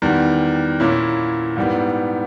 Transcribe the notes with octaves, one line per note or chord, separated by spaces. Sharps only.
E2 D#3 G3
A#2 A#3 C#4 E4
G#2 G3 B3 E4